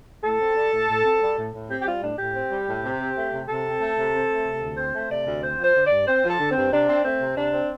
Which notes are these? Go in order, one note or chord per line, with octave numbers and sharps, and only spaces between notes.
A2 A4
C4
G3
A2
A2
C4
G3
A2
A2
C4 G4
G4
G3 F4
A2 D4
A2 G4
C4
G3
A2
C3
C4
A3
C3
C3 A4
C4
A3
C3
C4
A3
C3
D2
C4 C5
A3
C3 D5
D2
C4 C5
F3
C5
D3
D5
G2
C4 C5
F3
A4
D3
C4
G2
C3 D4
C4
A3 C4
C3
C3 D4
C4